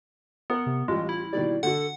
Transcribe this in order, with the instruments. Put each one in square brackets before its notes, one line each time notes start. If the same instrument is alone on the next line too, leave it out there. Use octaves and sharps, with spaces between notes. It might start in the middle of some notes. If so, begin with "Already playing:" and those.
[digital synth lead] B3 [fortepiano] A#4 F#5
[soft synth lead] C3
[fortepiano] A1 G3 G4 [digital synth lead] G#3 [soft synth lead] F4
[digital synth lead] E4
[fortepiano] B2 D#3 G3 [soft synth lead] D5
[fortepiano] D3 F#4 [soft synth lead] A4 [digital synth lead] F#5